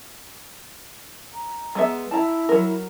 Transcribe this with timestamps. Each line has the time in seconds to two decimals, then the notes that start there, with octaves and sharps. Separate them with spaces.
1.34 A#5
1.75 G#3 B3 E5
2.11 E4 A5 A#5
2.49 F#3 A#4